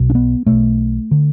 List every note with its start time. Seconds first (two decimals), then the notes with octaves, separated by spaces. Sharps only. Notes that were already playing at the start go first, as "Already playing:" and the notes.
Already playing: B1 B2
0.10 D4
0.15 B3
0.46 B1 B2 A3
1.11 D3